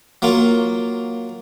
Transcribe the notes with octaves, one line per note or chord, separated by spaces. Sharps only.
F#3 A#3 F4